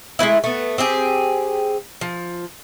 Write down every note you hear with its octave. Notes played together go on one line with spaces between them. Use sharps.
G#3 A3 B3 E4
A3 B3
C4 G4 G#4
F3